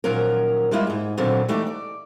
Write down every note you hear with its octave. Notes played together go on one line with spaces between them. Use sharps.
A#2 D#3 F3 F#3 C#4 A#4
G3 G#3 A#3 E4 F4 E5
G#2 G#4
A#2 D3 D#3 F#3 B3 C4
E3 A3 D#4 G4 D5
D5